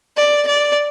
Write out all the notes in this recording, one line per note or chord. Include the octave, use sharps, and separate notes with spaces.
D5
D5